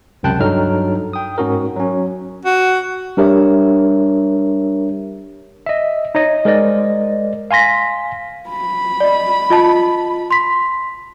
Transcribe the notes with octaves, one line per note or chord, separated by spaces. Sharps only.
C#2 F#2 C3 G5 A5 F#6
G2 F#3 D#4 A4 F6
G5 D#6
G#2 C#4 F#4 A#4
F#3 C#4
F#4
G3 D4 G4 A#4 C#5 E5
D#5 E5
D#4 C#5 D#5
G#3 A#4 C5 D5 D#5
F5 G#5 C6 A#6 B6
B5
D5 D#5
F4 D#5 A5
C6 B6